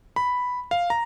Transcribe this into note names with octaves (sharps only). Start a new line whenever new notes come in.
B5
F5
A#5